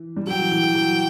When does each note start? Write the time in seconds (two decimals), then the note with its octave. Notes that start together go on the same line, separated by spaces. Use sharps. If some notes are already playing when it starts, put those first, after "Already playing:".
Already playing: E3
0.16 G3
0.27 F#3 G5
0.39 E3
0.51 E3
0.63 E3
0.75 F#3